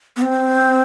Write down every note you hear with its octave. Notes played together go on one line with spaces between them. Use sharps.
B3
C4